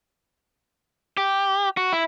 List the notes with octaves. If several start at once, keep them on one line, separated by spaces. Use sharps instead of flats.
G4
F#4
E4